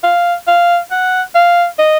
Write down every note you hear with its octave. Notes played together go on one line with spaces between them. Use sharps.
F5
F5
F#5
F5
D#5